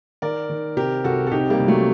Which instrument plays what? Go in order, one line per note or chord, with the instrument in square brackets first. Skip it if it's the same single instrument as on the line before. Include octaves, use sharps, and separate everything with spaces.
[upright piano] D#3 A#4 D5
D#3
C3 G4 A#4
C2 F#4 A4
A4
C3 D#4 G4
G3 A#3
C2
F#3 A3